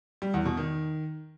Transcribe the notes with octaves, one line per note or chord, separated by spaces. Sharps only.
G3
E2
B2
D#3